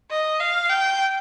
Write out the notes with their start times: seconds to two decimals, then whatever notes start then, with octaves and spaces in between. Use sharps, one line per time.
0.11 D#5
0.40 F5
0.70 G5